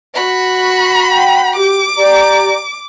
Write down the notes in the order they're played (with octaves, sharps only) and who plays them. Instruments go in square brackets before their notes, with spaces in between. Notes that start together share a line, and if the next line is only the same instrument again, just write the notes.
[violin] F#4 B5
[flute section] F#5 G5
[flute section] G4 [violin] D6
[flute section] G4 D5 A#5